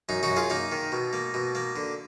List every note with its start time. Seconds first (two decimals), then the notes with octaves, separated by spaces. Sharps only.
0.09 F#2 D#4
0.23 D#4 F#4
0.30 F#2
0.36 F4 G#4
0.50 A#3 D#4
0.72 D#3
0.92 B2
1.13 A#3
1.34 B2
1.55 A#3
1.76 D3